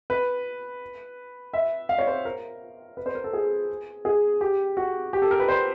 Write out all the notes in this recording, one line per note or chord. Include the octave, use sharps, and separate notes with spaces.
B4
E5
F5
C#5
C5
A#4
B4
C5
A#4
A4
G#4
G#4
G4
F#4
G4
A4
A#4
B4
C5